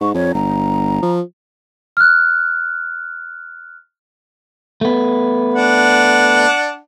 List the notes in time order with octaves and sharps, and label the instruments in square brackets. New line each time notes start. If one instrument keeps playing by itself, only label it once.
[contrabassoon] G#2 [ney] C#6
[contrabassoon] F2 [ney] C#5
[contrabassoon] G1 [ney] A#5
[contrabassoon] F3
[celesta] F6 F#6
[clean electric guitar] A3 B3
[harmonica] D4 F#5